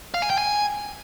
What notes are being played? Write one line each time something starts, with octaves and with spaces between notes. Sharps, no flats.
F5
G#5
G5
G#5